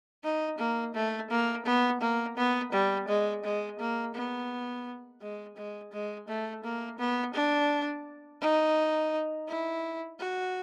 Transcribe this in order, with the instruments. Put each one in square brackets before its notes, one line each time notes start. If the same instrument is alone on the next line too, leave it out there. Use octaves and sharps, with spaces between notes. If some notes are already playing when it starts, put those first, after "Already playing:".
[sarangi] D#4
A#3
A3
A#3
B3
A#3
B3
G3
G#3
G#3
A#3
B3
G#3
G#3
G#3
A3
A#3
B3
D4
D#4
E4
F#4